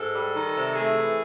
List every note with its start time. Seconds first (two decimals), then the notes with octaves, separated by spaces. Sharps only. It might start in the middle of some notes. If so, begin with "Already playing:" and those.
Already playing: G#2 A4
0.15 G3
0.35 D#3
0.56 C3
0.75 A3 G#4
0.96 E3